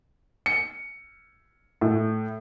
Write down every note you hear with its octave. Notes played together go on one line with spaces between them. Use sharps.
C#7
A2